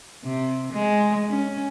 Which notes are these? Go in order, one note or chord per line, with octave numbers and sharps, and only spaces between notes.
C3
G#3
C#4